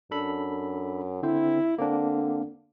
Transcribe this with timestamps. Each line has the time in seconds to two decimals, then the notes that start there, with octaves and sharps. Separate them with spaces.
0.11 F#2 D4 A4 B5
1.23 D3 C4 E4 C5
1.78 D3 A#3 C4 D4